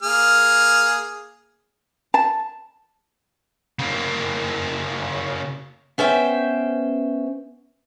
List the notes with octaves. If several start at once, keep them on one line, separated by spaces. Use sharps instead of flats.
A#3 G#4 F6
A5
C#3 A#3
B3 C#4 C5 E5 G5